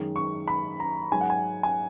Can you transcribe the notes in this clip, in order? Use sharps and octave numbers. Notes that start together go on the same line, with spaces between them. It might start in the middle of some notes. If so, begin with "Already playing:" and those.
Already playing: F#2 D#3 G#3
C#6
B5
A#5
G#2 F#3 G#5
F#5
G#5
G#5